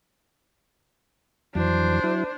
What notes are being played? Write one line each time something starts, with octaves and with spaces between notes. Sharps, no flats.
F2 E3 F#3 D4 C5
F#3 E4